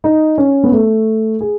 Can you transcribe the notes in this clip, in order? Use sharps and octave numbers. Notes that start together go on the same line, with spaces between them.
D#4
C#4
B3
A3
G#4